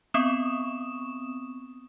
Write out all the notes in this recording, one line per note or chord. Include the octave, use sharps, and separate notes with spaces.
B3 C4 C#6 D#6 E7